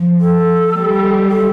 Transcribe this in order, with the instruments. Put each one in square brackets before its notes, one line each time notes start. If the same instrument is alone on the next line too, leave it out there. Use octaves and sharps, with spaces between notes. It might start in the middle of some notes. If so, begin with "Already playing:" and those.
Already playing: [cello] F3
[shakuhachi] A4
[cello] G3
[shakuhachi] A4